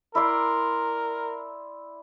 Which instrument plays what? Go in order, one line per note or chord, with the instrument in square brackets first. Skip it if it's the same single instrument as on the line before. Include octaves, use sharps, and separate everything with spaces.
[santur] E4 D5 C6 [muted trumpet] A#4